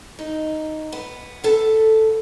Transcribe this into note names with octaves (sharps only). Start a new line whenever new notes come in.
D#4
B3
B3 A4 A5